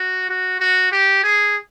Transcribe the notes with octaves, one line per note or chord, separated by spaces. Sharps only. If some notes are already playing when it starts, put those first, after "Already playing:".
Already playing: F#4
F#4
F#4
G4
G#4